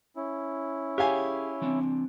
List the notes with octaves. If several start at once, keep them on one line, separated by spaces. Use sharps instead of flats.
C#4 E4
G4 G#4 C#5 E5 F5 G#5
E3 C4 D4